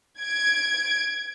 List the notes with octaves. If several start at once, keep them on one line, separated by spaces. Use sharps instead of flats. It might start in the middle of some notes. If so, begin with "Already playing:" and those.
G#6 D7